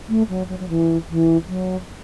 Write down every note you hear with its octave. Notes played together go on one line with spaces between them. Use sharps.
A3
F#3
F#3
F#3
E3
E3
F#3